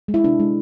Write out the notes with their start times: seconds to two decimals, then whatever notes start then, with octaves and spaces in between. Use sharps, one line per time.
0.08 G#3
0.14 E4
0.24 C3 D4
0.40 G#3